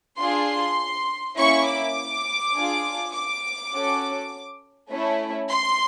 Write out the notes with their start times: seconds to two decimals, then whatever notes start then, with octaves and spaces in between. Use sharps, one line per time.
0.18 D4 F4 G#4 C6
1.37 A#3 C#4 E4 C#6
1.66 D6
2.55 D4 F4 G#4
3.14 D6
3.73 C#4 F#4 A4
4.91 A3 C#4 E4
5.50 C6